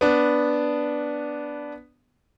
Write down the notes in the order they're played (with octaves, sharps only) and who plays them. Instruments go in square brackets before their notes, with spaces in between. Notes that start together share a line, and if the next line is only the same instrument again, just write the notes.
[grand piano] B3 D4